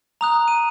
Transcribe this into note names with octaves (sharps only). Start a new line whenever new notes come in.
A#5 D#6 F#6 F7
D#7